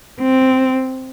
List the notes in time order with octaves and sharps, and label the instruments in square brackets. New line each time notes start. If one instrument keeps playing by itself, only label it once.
[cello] C4